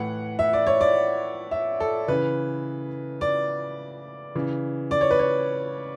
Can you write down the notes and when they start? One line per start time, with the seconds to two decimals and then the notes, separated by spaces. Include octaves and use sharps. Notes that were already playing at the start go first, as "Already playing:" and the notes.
Already playing: A2 E3 F#5
0.39 E5
0.53 D5
0.67 C#5
0.81 D5
1.51 E5
1.80 A4
2.08 C#3 E3 B4
3.21 D5
4.35 C#3 E3
4.91 D5
5.01 C#5
5.11 B4
5.19 C#5